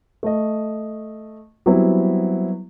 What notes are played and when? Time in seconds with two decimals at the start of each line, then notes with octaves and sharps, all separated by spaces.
0.23 A3 D#5
1.66 F#3 G3 B3 C4 E4